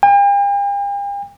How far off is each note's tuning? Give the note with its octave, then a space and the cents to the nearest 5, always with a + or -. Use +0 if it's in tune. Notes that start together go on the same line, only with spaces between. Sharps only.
G5 +45